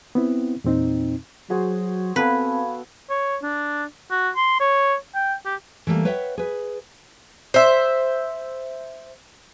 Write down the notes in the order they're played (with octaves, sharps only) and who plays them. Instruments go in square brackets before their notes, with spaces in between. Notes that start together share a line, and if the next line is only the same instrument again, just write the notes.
[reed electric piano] B3 C4 E4
E2 A#2 C4 D#4
[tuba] F#3 [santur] F#4 G#4 C5
[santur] B3 A4 G#5 [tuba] C4 [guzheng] B4 [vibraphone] F5 A5 B5
[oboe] C#5
D4
F#4
C6
C#5
G5
G4
[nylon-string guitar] E3 G3 A3 A#3
B4 C#5 E5 F#5 G5
G#4 B4
[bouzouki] C5 E5